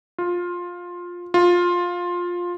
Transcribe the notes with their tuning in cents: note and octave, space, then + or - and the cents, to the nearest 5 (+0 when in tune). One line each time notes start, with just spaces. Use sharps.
F4 +10
F4 +10